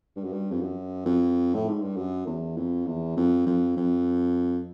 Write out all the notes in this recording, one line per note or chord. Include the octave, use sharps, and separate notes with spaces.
G2
F#2
G2
F2
F#2
F2
A2
G#2
G2
F#2
E2
F2
E2
F2
F2
F2